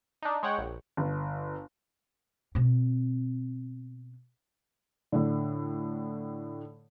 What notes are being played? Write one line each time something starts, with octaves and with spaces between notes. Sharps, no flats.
D4 D#4
G#3 C#5 F#5 G5
A#1
G1
B2 C4
A2 D3